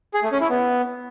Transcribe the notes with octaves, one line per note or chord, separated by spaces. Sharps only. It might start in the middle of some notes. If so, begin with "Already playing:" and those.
G#4
A3
C#4
E4
B3